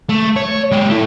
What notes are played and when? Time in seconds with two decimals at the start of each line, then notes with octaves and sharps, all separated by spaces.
0.09 A3
0.36 C#5
0.72 G#3 G4
0.90 A3 E4